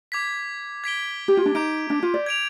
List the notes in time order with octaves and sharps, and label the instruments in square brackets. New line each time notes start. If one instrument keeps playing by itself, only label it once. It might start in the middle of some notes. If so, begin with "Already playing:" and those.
[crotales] D6 G#6 B6
G#6 B6 D7 G7
[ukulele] G4
F4
D4
[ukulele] D#4 [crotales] D6 G6 D7
[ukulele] D4
F4
D5
[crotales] G#6 D7 F7